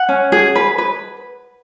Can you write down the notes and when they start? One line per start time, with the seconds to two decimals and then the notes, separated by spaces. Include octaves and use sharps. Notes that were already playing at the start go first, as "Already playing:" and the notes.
Already playing: F#5
0.09 C#4
0.32 G#4
0.56 B4
0.78 B4